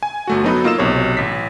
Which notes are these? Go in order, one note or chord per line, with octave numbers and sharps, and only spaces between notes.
G#5
G1 A3 F#4
F#3 B3 D#4 A4 B4
A#3 F4 D#5 E6 E7
B1 C3 C#5
A1 B6